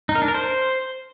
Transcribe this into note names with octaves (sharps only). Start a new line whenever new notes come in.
D#4
A#4
D4
A#4
C5